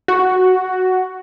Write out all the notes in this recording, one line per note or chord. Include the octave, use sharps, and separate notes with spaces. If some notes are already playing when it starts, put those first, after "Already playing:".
F#4